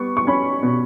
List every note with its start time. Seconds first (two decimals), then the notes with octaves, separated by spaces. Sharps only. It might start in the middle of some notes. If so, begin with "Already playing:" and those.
Already playing: G3 B3 C#6
0.17 C#6
0.27 C#4 B5
0.63 B2